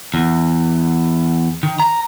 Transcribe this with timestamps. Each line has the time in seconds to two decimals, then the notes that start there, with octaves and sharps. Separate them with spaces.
0.14 E2
1.63 D#3
1.80 A#5